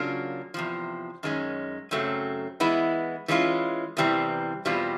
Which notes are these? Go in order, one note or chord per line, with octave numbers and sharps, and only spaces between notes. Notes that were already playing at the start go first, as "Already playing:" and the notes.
Already playing: C#3 F#3 A#3 D4 F4
E2 C3 F3
F#2 D#3 G#3 C#4
F#2 C#3 F#3 A3 C4
E3 G#3 B3 E4
E3 G#3 C#4 F4
E2 C3 E3 G3 C4
E2 B2 G3 C4 F4